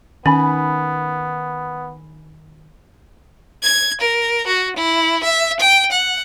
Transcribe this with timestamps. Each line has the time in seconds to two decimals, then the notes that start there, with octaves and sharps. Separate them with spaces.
0.26 D#3 B3 C#4 G#5 B5
3.63 G#6
4.01 A#4
4.47 F#4
4.76 E4
5.24 E5
5.60 G5
5.92 F#5